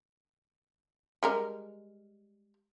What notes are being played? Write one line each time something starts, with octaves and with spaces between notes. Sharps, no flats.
G3 G#3 A#4